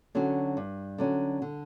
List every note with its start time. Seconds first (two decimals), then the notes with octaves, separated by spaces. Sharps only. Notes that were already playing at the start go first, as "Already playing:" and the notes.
0.15 D3 F#3 C#4 F#4
0.57 G2
0.98 D3 F#3 C#4 F#4
1.42 D3